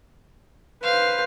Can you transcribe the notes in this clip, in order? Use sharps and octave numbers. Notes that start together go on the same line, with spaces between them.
B4 C5 F5